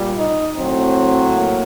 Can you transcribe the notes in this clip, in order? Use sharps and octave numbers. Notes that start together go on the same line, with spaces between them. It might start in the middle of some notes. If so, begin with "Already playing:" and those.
Already playing: A#2 G3
D#4
A2 F#3 C4
A#3